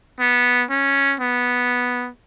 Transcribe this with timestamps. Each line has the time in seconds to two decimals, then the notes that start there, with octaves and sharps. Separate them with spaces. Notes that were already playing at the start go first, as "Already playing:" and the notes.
0.20 B3
0.70 C#4
1.20 B3